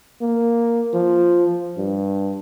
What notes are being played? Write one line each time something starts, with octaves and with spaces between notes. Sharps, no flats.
A#3
F3
G2